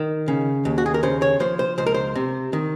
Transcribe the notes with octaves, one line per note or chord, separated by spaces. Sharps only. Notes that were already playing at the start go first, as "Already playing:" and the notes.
Already playing: D#3
C#3
D#2
F#4
G#4
A#4
C#3 C5
C#5
F3 C5
C5
C#2 C5
A#4
C5
C3
D#3